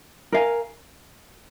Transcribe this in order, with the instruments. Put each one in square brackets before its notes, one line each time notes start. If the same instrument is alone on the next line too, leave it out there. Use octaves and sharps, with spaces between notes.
[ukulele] A#4 F5 G#5